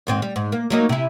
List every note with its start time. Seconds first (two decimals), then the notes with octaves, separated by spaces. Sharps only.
0.07 D#2 G#2 C4
0.22 G3
0.36 G#2
0.52 A#3
0.70 F#3 A#3 D#4
0.89 C3 E4